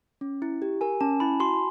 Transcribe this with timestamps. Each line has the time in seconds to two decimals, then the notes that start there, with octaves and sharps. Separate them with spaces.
0.21 C#4
0.42 E4
0.62 G4
0.81 A#4 G#5
1.01 C#4 A5
1.20 E4 B5
1.40 F#4 C6